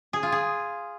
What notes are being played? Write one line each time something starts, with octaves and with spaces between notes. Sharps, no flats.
G#4
F4
G#4